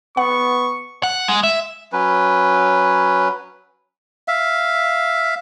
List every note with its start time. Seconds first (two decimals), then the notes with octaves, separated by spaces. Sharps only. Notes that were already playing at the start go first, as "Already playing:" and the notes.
0.17 B3 F#5 C#6
1.03 F#5
1.28 G#3
1.43 E5
1.93 F#3 C#4 B4
4.28 E5 F5